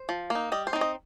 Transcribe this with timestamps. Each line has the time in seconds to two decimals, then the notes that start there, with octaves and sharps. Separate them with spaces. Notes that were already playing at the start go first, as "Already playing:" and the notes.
Already playing: C5
0.09 F3
0.30 A#3
0.35 D#4
0.52 G3 D#5
0.67 C5
0.73 C4 D#4
0.81 D#5